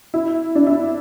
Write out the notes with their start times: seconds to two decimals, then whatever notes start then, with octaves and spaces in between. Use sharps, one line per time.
0.14 E4
0.55 D4
0.67 E4